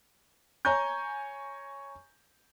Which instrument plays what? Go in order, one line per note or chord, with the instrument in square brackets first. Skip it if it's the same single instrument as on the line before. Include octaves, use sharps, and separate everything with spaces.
[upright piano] C#5 G#5 A#5 C#6 G6